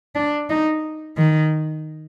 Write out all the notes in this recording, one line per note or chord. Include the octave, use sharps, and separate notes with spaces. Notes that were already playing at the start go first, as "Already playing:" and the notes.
D4
D#4
D#3